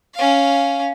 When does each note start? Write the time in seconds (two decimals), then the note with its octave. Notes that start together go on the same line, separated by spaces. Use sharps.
0.14 C#4 F5